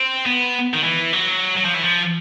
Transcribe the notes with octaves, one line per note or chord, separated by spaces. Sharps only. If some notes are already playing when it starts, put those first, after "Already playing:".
Already playing: C4
B3
D#3
E3
F#3
F#3
F3
E3
F3